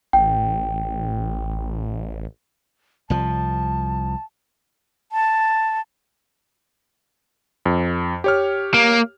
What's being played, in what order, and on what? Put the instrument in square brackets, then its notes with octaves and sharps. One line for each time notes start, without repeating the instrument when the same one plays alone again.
[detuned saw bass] A1 [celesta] G5
[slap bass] C2 F3 [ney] A5
[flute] A5
[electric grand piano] F2
G4 C#5 F6
[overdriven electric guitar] A#3